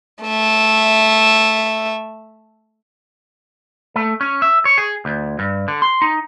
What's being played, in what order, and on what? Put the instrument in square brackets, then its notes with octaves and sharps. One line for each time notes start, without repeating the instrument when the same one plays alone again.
[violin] A3 E5
[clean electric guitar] A3
C#4
E5
C#5
G#4
D2
G2
D3
C6
D#4